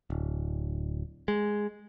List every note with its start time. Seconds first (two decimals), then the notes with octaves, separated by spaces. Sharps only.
0.10 D1
1.28 G#3